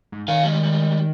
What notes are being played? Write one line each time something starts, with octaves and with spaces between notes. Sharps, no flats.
G#2
D#3 F5 G#5
G3 G#3